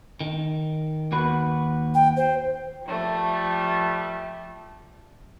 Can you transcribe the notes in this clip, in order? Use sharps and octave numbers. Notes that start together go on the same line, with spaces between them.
D#3
D#2 F#4 B4
G5
C5
F3 G3 A3